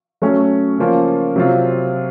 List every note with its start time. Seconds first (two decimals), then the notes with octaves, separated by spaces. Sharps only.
0.22 F#3 A3 C#4
0.78 C#3 F3 A#3 C#4 F4
1.36 C3 F#3 C4 F4